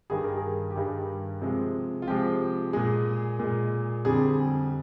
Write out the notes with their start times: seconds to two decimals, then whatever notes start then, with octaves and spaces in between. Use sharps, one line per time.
0.10 G2 D#3 G3 G#4
0.24 A#4
0.37 G#4
0.71 G4
0.76 G2 D#3 G3 G#4
1.42 C3 F3 G#3
2.02 F4
2.07 C3 F3 G#3 G4
2.73 A#2 G#3 G#4
3.39 A#2 G#3
4.05 F2 D3 G3 G#4